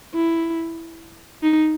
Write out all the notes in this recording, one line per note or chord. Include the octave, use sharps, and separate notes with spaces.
E4
D#4